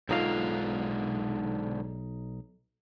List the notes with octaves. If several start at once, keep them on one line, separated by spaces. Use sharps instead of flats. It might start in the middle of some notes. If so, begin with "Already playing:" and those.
B1 G#2 D3 D#4 F4 A4 C#5 F5